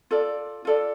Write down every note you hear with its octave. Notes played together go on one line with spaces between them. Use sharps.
F4 A4 D5
F4 A4 D5